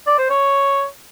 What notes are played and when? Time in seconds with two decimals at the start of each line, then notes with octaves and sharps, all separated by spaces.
0.07 D5
0.18 C5
0.30 C#5